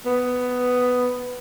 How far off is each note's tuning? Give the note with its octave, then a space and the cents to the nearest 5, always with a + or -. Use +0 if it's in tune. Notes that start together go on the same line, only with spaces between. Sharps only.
B3 +10